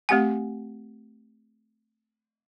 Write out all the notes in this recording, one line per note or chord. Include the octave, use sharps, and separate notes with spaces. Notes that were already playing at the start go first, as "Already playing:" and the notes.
A3 C4 G4 F#5 G#5